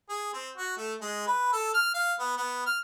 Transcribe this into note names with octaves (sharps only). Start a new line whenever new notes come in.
G#4
C4
F#4
A3
G#3
B4
A4
F6
F5
B3
B3
F6